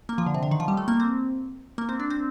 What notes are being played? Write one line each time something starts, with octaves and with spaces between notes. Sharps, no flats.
A#3
F3
D3
C3
D3
D#3
F3
G3
A3
A#3
C4
A#3
C4
D4
C4